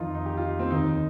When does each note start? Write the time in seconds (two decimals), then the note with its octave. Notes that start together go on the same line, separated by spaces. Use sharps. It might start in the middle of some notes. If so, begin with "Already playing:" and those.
Already playing: F2 D#3 D#4 F4
0.15 D#4
0.26 G4
0.37 F4
0.59 C4
0.71 D#2 D#3 D#4